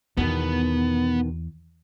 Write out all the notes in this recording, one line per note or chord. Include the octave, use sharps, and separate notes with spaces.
E2 B2 D#3 B3